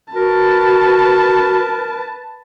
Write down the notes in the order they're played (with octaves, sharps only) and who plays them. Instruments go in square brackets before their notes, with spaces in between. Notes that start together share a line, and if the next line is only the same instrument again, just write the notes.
[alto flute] F#4 [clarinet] A#4 [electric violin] B4 A5